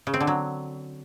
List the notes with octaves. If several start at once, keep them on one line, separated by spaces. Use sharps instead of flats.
C#3
C4
D3
F#3